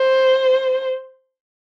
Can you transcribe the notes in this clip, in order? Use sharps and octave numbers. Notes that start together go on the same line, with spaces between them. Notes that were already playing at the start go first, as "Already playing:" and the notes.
Already playing: C5